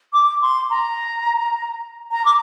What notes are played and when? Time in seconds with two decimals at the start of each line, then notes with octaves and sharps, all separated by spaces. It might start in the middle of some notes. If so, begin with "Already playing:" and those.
0.13 D6
0.41 C6
0.70 A#5
2.11 A#5
2.25 D6